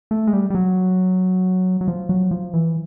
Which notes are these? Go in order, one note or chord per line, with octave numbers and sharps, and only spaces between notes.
A3
G#3
G3
G3
F#3
F#3
F3
F#3
F3
E3